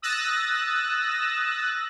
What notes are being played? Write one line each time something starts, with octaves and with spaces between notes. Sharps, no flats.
D#6 E6 F#6 A6 A#6